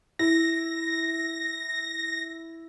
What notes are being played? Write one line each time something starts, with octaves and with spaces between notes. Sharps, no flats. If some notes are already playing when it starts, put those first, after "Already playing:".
E4 A#6